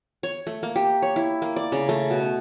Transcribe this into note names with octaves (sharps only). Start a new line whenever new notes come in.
C#5
A3
A#3
G4
C#5
E4
A#3
D5
C#3
A3
B2